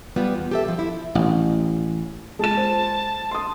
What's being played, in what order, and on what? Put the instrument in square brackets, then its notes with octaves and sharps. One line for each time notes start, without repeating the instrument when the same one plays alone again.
[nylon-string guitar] G3 B3 F4
E2
G4 A4 E5
E3 F3
E4
[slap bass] A1
[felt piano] G#3 F4 E7 [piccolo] A5
[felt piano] C5
C6 D#6